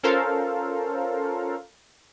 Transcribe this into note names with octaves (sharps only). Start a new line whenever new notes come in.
C#4 F4 A4 A#4 C5 F5